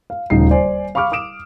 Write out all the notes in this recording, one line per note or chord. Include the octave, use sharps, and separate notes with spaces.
F5
D#1 D2 C#3 D#4 F5 C7
C5 D5 G#5
F5 B5 C#6 D6 F6
D6 D#6 D7 E7